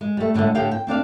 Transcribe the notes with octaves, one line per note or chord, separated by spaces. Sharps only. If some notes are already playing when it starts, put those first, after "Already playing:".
G#3
G3 A3
A2 D3 F#3 G#3 A3
A2 D3 G4 F5 G5
G5
C4 D4 D5 F5